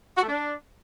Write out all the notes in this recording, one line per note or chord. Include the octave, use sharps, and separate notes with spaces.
F#4
A3
D4